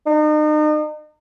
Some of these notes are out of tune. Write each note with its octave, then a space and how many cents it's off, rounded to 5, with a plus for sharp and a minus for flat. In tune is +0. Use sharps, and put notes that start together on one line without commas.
D#4 -40